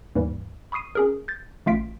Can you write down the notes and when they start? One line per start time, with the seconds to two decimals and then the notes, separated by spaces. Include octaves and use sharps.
0.16 D#2 G#2 E3 G3
0.72 B5 C#6 D#6 C7 D#7
0.95 C#4 G#4 A#4
1.28 G6 A6
1.66 A1 A3 F4 F5 B6 D7